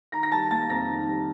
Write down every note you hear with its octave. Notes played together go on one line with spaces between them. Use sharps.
D#3 A#5 A#6
A#6
G3 A5 A6
A#3 A5 A6
F2 A#5 A#6
D#3
G3